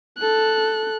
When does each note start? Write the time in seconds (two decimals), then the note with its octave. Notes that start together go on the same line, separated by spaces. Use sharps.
0.18 A4 F#6